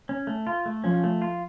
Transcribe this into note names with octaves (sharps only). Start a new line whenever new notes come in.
C#4
A3
F4
A3
F3 C#4
A3
F4